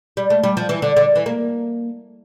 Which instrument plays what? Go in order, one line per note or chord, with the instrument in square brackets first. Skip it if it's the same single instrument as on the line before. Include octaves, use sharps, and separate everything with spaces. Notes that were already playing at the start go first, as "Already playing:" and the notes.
[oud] G3
A3
G3
F3
E3
D3
D3
E3
A#3